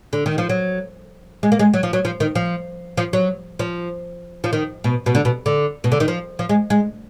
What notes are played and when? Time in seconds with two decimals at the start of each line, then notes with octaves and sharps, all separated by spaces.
0.13 D3
0.26 D#3
0.38 F3
0.50 F#3
1.43 G#3
1.52 A#3
1.59 G#3
1.74 F#3
1.83 F3
1.93 F#3
2.05 F3
2.20 D#3
2.35 F3
2.97 F3
3.13 F#3
3.59 F3
4.44 F3
4.53 D#3
4.84 B2
5.06 B2
5.15 D3
5.25 B2
5.46 D3
5.84 B2
5.92 D3
6.00 D#3
6.08 F3
6.39 F3
6.49 G#3
6.70 G#3